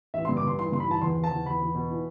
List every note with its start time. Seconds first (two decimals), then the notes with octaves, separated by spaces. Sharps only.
0.14 A1 E5
0.25 G2 C6
0.37 D6
0.44 G2 C6
0.59 E3 C6
0.72 G2 C6
0.80 B5
0.88 E3 A5
1.02 E2 C6
1.17 E2
1.24 A5
1.31 E2
1.46 E2 B5
1.60 E2
1.75 B2
1.90 E3